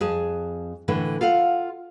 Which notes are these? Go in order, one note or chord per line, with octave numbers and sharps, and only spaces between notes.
F2 G#4 A5
A2 D3 E3 A3
F4 A4 F5 F#5